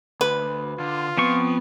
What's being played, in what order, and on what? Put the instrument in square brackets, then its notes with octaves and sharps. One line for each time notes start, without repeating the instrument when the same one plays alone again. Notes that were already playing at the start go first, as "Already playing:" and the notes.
[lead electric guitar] D2 [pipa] B4
[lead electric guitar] D3 [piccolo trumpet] F4
[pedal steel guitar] F3 C4 C#6 [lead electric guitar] B3